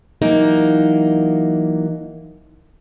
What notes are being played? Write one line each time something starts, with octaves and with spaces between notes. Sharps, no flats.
E3 F#3 A#3 D#4